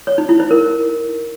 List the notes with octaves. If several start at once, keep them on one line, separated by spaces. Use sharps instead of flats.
C#5
D#4
E4
C5
A#4